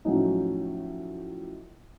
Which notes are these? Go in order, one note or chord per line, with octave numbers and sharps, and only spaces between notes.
A2 F3 F#3 C#4 D#4